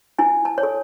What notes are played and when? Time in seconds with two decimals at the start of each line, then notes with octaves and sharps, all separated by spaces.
0.19 E4 G#5
0.45 A5
0.58 C#5
0.63 A4